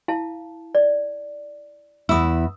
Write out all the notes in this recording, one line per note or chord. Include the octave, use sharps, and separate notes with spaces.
E4 F5 A5
D5
E2 E4 D#6 E6